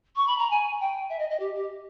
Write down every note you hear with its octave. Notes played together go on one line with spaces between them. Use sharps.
C#6
B5
A#5
G#5
G5
E5
D#5
D#5
G4
G4